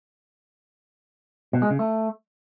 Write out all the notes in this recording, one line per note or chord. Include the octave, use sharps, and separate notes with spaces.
B2
G#3
C#3
A3